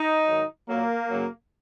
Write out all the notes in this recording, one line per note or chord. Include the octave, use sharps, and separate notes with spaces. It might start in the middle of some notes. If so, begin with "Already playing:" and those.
Already playing: D#4
G#2 D#3 F#3
A#2 F#3 A#3
F#2 C#3 F#3